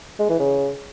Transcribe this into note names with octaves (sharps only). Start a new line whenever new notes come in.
G#3
E3
C#3